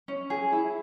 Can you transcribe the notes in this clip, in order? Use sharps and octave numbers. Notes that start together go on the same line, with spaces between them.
C#4
G#4
E4